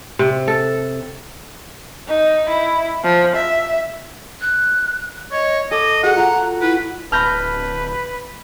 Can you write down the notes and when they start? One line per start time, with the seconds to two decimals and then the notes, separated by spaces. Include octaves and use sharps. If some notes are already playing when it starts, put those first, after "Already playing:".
0.19 C3
0.48 A4
2.08 D#4
2.50 E4
3.05 F3
3.36 E5
4.41 F#6
5.32 C#5 D#5
5.71 A4 D#5 D6
6.03 F#4 G#4 F#5
6.16 F4 F#4 A#5
6.62 E4 B4
7.12 D1 B4 A5 B5 F6 G6 A#6